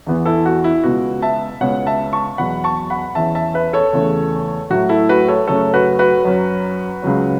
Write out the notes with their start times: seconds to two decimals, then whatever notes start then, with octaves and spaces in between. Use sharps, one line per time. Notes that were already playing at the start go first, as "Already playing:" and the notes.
0.07 E2 E3 B3
0.26 E4 A4
0.46 F#4
0.64 E4
0.84 C#2 B2 B3 F#4
1.22 E5 A5
1.61 C#2 B2 B3 C#5 F#5
1.87 E5 A5
2.13 A5 C#6
2.38 E2 B2 F#3 F#5 B5
2.64 A5 C#6
2.90 F#5 B5
3.15 E2 E3 C#4 E5 A5
3.35 E5 A5
3.54 B4 E5
3.73 A4 C#5
3.93 E2 C#3 E3 A3 C#4
4.70 A2 F#3 A3 F#4
4.89 E4 A4
5.09 F#4 B4
5.28 A4 C#5
5.48 F#2 C#3 A3 C#4 A4 C#5
5.74 F#4 B4
5.99 F#4 B4
6.25 F#2 F#3 C#4
7.02 C#2 C#3 F#3 C#4